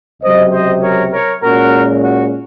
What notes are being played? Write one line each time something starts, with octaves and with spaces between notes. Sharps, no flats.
C#2 C3 F#3 C5 D#5
C5 D#5
A#4 C#5
A#4 C#5
A#2 G#3 C#4 F#4 A#4
F#4